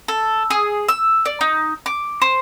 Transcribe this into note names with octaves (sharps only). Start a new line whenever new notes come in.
A4
G#4
E6
D5
D#4
D6
C5